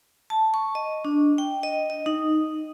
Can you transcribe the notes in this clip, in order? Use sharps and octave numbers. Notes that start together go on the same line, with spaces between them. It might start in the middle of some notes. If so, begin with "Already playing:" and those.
A5
C#6
D#5
D4
G5
D#5
D#5
D#4